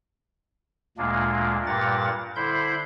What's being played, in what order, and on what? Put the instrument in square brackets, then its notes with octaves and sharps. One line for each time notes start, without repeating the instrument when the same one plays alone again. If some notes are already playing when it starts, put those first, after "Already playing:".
[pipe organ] D2 A#2 G#3 A#3 D4
G2 A#2 G3 A#4 F#5 A6
D3 E4 C5 B5 C6 G6